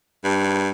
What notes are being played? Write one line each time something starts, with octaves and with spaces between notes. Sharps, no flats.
G2